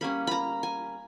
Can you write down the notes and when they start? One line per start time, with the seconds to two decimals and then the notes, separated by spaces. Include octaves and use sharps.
0.01 G3 A#3 C#4 B5
0.27 A#5 B5
0.63 G#5